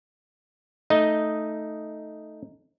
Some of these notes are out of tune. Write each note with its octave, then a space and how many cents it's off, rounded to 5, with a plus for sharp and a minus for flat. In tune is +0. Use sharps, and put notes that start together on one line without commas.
A3 +0 D#4 +0 D#5 +0